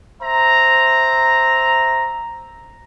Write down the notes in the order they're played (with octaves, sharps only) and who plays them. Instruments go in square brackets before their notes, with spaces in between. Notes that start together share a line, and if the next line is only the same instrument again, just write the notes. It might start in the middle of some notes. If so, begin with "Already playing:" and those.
[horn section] C5 E5 A#5